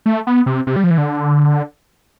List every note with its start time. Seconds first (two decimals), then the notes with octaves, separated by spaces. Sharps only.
0.06 A3
0.27 B3
0.46 C3
0.67 C3
0.76 G3
0.84 F3
0.91 E3
0.98 D3